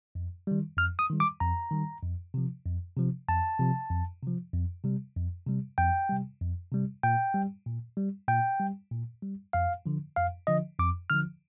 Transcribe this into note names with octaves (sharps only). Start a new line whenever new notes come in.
F2
D#3 G3
F2 F6
D#6
D#3 G3
D6
F2 A#5
D#3 G3
F2
C3 F3
F2
C3 F3
F2 A5
C3 F3
F2
C3 F3
F2
C3 G3
F2
C3 G3
F2 G5
C3 G3
F2
C3 G3
A#2 G5
G3
A#2
G3
A#2 G5
G3
A#2
G3
F2 F5
D3 F3
F2 F5
D3 F3 D#5
F2 D6
D3 F3 F6